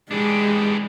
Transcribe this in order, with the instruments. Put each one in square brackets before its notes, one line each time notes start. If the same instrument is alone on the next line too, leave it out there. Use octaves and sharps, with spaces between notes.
[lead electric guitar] E3 D4 [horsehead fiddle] G#3 [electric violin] G4 G#4